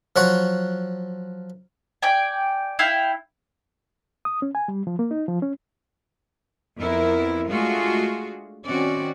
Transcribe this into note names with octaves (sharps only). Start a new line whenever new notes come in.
F3 F#3 F#5 C#6
D5 G5 G#5
E4 F5 G5
D#6
C#4
G#5
G3
F3
A#3
D#4
F3
C#4
F2 B3 E4 A#4
G#3 A3 D4 F4 F#4 G#4
D#3 C4 C#4 F#4 D5